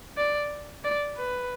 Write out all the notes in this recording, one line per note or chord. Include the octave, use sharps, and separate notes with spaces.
D5
D5
B4